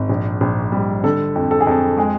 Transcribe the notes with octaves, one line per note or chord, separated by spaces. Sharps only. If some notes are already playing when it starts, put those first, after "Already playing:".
Already playing: G#1
A#1
A#1
G3
D3 A4
F2
A4
G#4
F2 A4
G#3 G#4